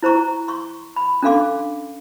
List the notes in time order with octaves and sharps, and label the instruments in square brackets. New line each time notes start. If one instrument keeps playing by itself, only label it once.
[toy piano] E4 C5 A#5 C#6
C6 C#6
B5
C#4 D4 A4 F5 C6 D6